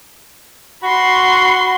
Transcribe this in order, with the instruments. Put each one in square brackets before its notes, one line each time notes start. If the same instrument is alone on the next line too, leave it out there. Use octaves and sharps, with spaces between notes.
[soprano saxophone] F#4 [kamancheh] B5 C6